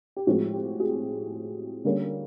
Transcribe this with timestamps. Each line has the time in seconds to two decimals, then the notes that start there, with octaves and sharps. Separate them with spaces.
0.17 G4
0.27 A2 F3 G#3 C4 F#4
0.53 G4
0.80 F#4 G#4
1.85 D3 G3 A#3 C#4